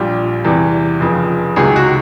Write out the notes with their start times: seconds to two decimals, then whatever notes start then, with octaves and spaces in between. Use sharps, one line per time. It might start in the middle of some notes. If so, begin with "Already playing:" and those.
Already playing: A#1 A#2 G3
0.45 E2 C3 E3 G3
1.00 F1 F2 C#3 F3
1.56 C#2 C3 D#3 F#3 G#4
1.76 F#4